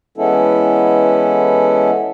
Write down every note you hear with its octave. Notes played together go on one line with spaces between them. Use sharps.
E3 G#3 B3 C#4 E4 A4